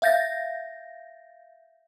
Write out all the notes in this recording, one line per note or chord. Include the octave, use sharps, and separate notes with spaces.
E5 F5 G6 A6 A#6